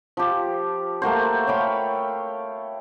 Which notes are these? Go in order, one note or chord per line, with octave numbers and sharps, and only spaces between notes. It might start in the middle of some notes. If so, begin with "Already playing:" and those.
F3 G4
A3 A#3 F#4 C5
C#5 F5 G5 B5